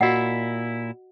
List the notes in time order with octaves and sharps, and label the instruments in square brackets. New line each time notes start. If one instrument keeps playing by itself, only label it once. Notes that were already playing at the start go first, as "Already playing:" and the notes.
[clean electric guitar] A#2 E4 [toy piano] F#4 D#5 F#5